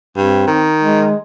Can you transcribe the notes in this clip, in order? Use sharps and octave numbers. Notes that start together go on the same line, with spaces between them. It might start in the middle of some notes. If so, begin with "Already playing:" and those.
G2 C4
D#3
G#3